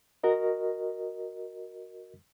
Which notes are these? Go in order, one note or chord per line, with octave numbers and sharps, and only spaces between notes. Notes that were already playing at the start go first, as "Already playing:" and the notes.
F#4 A#4 D#5